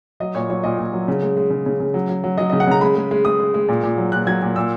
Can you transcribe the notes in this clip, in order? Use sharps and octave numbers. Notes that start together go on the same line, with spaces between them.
F#3 D#5
A#2 C#5
F#3 C#5
A#2 D#5
A#2
F#3
C#3
G#3
G#3
C#3
C#3
C#3
F#3
F#3
F#3
F#3 D#5
D#5
C#3
F#5
C#3 A#5
G#3 B5
G#3
G#3
G#3 D#6
G#3
G#3
A#2
A#2
F#3
A#2 F#6
F#3 G#6
A#2
A#2 E6